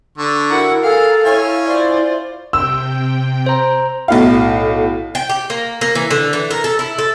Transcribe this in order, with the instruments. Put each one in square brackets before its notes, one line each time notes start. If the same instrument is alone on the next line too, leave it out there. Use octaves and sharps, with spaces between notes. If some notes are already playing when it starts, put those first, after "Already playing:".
[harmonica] D3 C#6
[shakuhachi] E4 [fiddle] F#4 F#5 [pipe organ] A#4
[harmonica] G#4 [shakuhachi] A4 [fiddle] F5
[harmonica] C#4 C#5 G#5 [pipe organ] E4 [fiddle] F5
[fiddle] F4 C5 [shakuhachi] D5
[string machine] C3 G5 [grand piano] E6
[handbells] C5 A#5
[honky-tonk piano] B1 A2 F5
[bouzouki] G5
G4
A#3
A#3
E3
D3
E3
A#4
A4
E4
A4